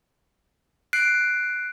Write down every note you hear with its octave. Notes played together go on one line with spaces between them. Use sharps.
F#6 C7 D7